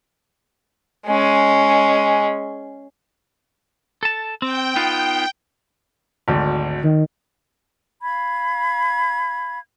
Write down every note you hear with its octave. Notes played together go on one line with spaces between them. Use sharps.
G#3 C#4
A4 A5
C4 G5
B3 D#4 F4
G#1 D2
D#3
F5 B5 G#6